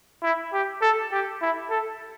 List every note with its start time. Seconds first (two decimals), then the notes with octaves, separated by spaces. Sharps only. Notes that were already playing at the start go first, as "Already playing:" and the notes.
0.23 E4
0.53 G4
0.82 A4
1.12 G4
1.42 E4
1.70 A4